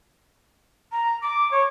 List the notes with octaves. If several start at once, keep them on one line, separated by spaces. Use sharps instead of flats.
A#5
D6
C#5